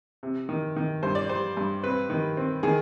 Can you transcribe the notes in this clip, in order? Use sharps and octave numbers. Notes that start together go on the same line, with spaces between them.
C3
D#3
D#3
G2 C5
D5
G3 C5
G2
C4 B4
D#3
C4
D#3 G#4